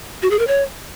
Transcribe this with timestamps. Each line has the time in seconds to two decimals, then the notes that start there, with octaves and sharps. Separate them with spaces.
0.22 F#4
0.31 G#4
0.39 A#4
0.47 C#5